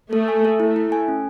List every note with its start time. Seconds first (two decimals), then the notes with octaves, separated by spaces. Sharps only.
0.12 A3 A4
0.28 G#5
0.45 A4
0.60 A3 E4
0.76 E4
0.92 G#5
1.08 C#4